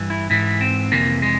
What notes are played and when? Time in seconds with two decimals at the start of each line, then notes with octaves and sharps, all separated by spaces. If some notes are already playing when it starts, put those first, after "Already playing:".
Already playing: G2 E3
0.10 E4
0.30 G#2 E3 E4
0.61 C4
0.92 F2 C3 E3 A#3
1.22 G#3